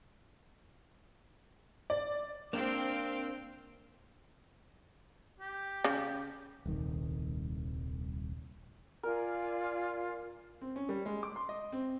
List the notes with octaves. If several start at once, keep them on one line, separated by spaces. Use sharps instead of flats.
D5
A#3 C4 D4 F5 G5
G4
C#3
D#1 C2 D#3
F4 A#4 D5 G#5
C4
C#4
G3
G#3
D6
C6
D#5
C4